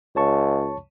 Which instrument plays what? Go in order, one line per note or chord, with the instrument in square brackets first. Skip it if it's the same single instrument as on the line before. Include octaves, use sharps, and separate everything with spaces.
[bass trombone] C#2 [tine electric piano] C#5 A5 C#6